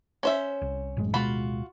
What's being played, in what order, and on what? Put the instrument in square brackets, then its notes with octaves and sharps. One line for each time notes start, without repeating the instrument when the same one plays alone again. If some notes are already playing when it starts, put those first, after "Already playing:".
[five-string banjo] C#4 C5 E5
[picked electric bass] C2
A1 F#2 G#3
[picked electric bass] D1 B2 G#3 [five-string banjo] F4 F#4 B5